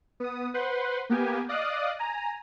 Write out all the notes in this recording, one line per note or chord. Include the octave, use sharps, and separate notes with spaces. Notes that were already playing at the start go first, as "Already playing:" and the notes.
B3 D#6
B4 C5 F#5 C6
A#3 B3 G4 G#5
D5 D#5 F5 D#6 F#6
G#5 A#5